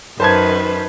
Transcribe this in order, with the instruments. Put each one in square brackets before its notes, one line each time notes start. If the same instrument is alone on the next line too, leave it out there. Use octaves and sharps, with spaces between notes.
[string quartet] F#2 D#3 B4 [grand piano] C5 A5 G#6